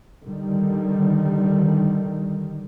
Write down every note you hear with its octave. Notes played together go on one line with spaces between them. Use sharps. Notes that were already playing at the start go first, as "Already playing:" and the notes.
D3 D#3 G3